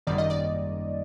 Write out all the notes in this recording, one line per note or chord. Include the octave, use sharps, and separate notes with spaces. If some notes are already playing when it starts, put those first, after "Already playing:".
G#1 F#2 D#3 G3 A#3 D5
D#5
D5